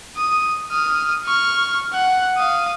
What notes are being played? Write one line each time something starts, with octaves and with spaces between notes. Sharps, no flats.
D#6
D#6 F6
C#6 F6
F#5
F5 D#6